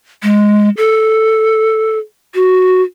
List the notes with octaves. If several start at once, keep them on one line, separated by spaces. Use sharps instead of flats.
G#3
A4
F#4